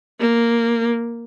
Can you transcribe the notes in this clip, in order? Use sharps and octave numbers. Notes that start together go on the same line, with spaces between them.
A#3